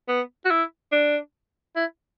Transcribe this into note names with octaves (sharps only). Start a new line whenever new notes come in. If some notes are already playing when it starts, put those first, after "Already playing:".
B3
F#4
E4
D4
E4